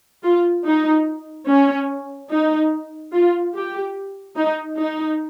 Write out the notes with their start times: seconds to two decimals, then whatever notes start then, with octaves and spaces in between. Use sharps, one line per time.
0.23 F4
0.65 D#4
1.48 C#4
2.30 D#4
3.13 F4
3.55 G4
4.37 D#4
4.78 D#4